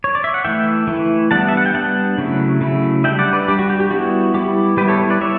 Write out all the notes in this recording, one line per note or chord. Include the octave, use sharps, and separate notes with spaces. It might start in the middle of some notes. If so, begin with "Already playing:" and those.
C#5
D5
E5
F#5
E3 A3 E4 E5 G5
E3 A3 E4
G3 B3 D4 F#5 A5
E5
F#5
G5
G3 B3 D4 F#5 A5
C#3 F#3 A3 E4
C#3 F#3 A3 E4
G3 D4 E5 G5
D5 F#5
B4 D5
G3 D4 G4
F#4
G4
G4
G3 B3 E4 F#4
G3 B3 E4 G4
G3 B3 E4 G4 B4
A4 C#5
B4 D5
G3 B3 E4 C#5 E5